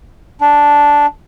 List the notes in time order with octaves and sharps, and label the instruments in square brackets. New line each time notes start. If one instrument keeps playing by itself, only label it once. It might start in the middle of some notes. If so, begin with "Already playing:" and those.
[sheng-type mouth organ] D4